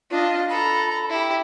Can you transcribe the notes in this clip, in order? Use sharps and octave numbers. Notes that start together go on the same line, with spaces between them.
D4 F4 D#5
A4 A#5 B5
E4 G4